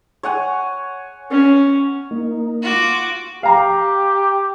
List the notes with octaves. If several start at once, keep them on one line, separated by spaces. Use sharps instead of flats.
C#5 F#5 G#5
C#4
A#3 D#4
F4 F#4 D6
G4 F5 A#5